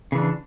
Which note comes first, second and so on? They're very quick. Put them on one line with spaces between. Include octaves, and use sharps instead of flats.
C#3 E3 D4